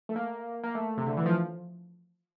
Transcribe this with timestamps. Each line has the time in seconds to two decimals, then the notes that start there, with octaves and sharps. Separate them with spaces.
0.09 A3
0.16 A#3
0.64 A#3
0.75 A3
0.97 C3
1.06 D3
1.17 E3
1.26 F3